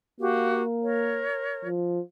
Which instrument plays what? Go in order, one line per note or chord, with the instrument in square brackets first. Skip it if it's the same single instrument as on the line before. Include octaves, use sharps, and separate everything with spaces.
[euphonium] A#3 [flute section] F#4 G4 F5
[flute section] A#4 C#5
[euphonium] F3